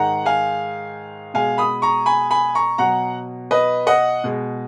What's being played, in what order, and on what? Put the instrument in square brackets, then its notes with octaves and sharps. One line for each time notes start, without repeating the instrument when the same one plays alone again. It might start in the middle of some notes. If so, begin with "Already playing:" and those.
Already playing: [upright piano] G#2 D#3 G#3 F#5 A#5
F5 G#5
B2 G#3 F5 G#5
B5 D#6
A#5 C#6
G#5 B5
G#5 B5
A#5 C#6
B2 F#3 F#5 A#5
B4 D#5
D#5 F#5
B2 G#3